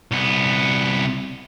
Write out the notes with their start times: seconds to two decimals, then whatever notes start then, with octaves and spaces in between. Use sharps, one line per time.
0.12 C2 B3